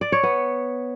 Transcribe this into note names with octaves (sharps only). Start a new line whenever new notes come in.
D5
C#5
B3